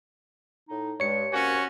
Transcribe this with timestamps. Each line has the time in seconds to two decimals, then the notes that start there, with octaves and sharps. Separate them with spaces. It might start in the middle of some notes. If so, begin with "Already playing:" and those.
0.69 A2 D#4
1.00 G2 G#3 C#5 C#7
1.33 C3 A#3 C#4 F#4 G#5